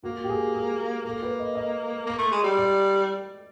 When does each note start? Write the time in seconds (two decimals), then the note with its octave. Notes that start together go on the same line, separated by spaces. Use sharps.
0.04 A#3 F#4
0.24 G4
0.29 G#4
0.55 G#4
1.05 A#3 A4
1.23 B4
1.39 D#5
1.55 D#5
2.06 A#3
2.19 A3
2.32 G#3
2.44 G3
2.57 D5